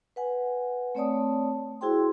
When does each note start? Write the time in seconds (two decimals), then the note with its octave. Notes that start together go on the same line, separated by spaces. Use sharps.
0.16 B4 F#5 G#5
0.95 A3 C4 C#5 D5 A5 D#6
1.81 E4 F#4 G#4 C5 G5 C6